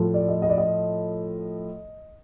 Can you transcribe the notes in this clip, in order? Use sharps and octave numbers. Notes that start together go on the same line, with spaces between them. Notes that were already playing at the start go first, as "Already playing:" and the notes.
Already playing: A2 F3
D5
D#5
D#5
D5
D#5